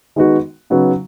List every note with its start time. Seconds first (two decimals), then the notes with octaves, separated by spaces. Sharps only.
0.16 D#3 G#3 B3 D#4 F#4
0.70 C#3 F#3 B3 D#4 F#4